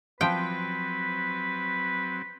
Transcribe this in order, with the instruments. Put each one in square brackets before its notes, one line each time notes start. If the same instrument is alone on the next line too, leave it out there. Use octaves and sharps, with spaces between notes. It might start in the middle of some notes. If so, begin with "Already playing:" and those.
[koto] F3 G5 [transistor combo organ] F#3 C4 [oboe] B4